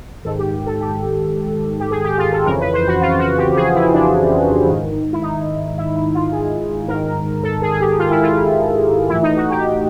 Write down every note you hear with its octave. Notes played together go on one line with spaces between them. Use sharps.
G#2 D#3 A4
G4
A4
G4
G4
G#4
G4
F4
A4
F2 C#3 E3 A#4
B4
C5
F#4
F4
F#4
G4
G#4
E4
D4
G#2 D#3
E4
D#4
E4
E4
F4
G#4
G#2 D#3 A#4
A4
G#4
G#4
G4
F4
E4
F4
A2 E3 E4
D#4
F#4
G4